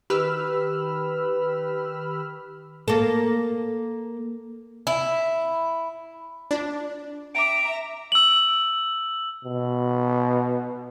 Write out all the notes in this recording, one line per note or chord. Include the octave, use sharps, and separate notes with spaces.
D#3 G4 B4 B5 E6 F6
A#3 A4
E4
D4 F4 D5
E5 G5 A#5 D6 D7
E6 F#7
B2